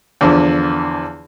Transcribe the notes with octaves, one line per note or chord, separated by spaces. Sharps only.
E2 D3 F3